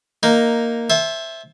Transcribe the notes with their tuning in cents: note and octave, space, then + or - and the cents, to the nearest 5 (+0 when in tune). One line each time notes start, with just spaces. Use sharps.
A#3 -5 D#4 +0
C5 +20 E5 +0 A5 -35